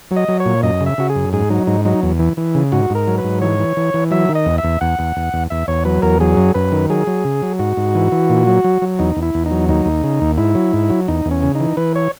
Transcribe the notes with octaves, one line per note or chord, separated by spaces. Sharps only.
F#3
D#5
F#3
C#5
A#2
F#2 D#5
C#3
E5
C#3 F#4
G#4
F#2
G#2 G#4
F#3 D#4
G#2 D#4
F#3 D#4
E2
E3
E3
C#3
G#2 F#4
G#2 A#4
F#3
B4
G#2
E3 C#5
E3
E3
E3
F#3 E5
D#3
D#5
E2
E5
E2
E2 F#5
E2
E2
E2
E2 E5
E2 C#5
F#3 B4
E2 A#4
F#3 G#4
F#2
F#2 B4
D#3
F#3 G#4
F#3
C#3
F#3
G#2 F#4
G#2
E3
E3
A#2
F#3
F#3
F#3
E2 D#4
E2
E4
E2
D#4
F#3
D#2 D#4
D#2
C#3
D#2
G#2 E4
F#3
G#2
F#3
E2 D#4
E2
C#4
C#3
D#4
E3
E3 B4
C#5